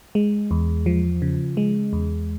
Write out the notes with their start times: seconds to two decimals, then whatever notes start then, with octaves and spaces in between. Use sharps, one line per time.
0.15 G#3
0.51 E2
0.86 F3
1.22 C#3
1.57 G#3
1.93 E2